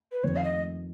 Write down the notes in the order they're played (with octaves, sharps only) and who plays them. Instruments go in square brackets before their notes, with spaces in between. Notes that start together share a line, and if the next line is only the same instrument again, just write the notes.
[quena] B4
[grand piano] F2 D#3 A#3 [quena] C#5
[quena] F5
D#5